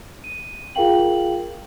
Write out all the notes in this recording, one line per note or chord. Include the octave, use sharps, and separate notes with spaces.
D#7
F4 G#4 A#4 F5 G5 F#7